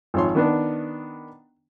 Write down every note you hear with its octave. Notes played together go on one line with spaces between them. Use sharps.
G#1 F3 C#5 C6
D#3 B3 D4